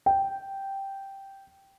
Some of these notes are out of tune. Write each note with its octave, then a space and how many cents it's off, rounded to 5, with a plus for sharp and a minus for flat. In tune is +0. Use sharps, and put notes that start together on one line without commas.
G5 -5